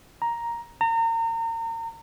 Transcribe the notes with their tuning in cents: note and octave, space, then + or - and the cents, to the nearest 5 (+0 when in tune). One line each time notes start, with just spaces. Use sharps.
A#5 +5
A#5 -35